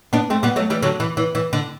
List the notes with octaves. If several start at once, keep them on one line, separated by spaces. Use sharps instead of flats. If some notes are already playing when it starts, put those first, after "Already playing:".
B3 D4
A3 C4
G3 B3
F#3 A3
E3 G3
D3 F#3
E3
E3
E3
D3